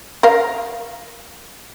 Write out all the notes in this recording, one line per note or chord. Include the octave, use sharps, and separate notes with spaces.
A#4 F5